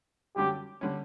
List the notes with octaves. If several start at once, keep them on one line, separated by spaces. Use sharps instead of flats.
F#2 D3 G3 C#4 G4
D3 G3 C#4